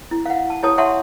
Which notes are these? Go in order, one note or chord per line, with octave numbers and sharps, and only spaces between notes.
E4
F5 F#5
A5
E4 G4 C#5 A5 D#6
C#5 E5 F#5 A5 C6 C#6